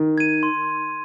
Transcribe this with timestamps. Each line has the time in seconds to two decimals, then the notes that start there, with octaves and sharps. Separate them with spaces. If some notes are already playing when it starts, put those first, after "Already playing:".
Already playing: D#3
0.18 G#6 D#7
0.43 C6